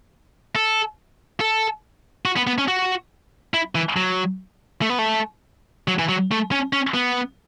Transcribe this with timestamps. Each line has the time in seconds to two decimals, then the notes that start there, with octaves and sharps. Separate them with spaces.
0.55 A4
1.40 A4
2.25 F#4
2.36 B3
2.47 B3
2.58 C#4
2.68 F#4
3.54 E4
3.75 E3
3.97 F#3
4.82 A3
4.90 B3
4.99 A3
5.88 F#3
5.99 E3
6.09 F#3
6.31 A3
6.52 C#4
6.73 C#4
6.94 B3